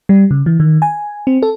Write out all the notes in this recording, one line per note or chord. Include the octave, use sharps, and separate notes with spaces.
G3
C#3
E3
D#3
G#5
C4
A4